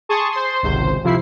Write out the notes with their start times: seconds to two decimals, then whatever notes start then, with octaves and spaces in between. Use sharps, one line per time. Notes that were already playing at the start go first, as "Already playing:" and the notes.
0.09 G#4 A5 C6 C#6 D#6
0.31 C5 C6
0.63 G#1 C#2 C3 C5
1.03 F2 C3 F3 E4 C7